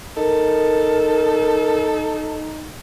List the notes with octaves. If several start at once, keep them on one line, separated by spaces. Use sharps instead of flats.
D#4 A4 A#4